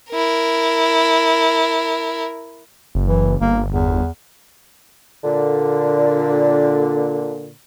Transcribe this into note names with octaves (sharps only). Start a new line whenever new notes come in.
E4 A#4
F#1
E3
G1 A#3
E2
A#2 D3